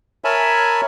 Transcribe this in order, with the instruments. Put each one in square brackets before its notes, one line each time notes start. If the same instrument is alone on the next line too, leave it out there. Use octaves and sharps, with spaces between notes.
[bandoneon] A#4 C#5 E5 G#5 A5 B5